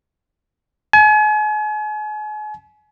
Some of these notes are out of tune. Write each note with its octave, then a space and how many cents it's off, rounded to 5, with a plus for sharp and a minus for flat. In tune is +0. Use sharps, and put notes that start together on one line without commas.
G#5 +40